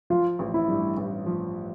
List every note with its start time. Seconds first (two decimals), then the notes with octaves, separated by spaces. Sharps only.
0.10 F3 F4
0.39 A1
0.54 E4
0.68 G2
0.97 A1
1.26 F3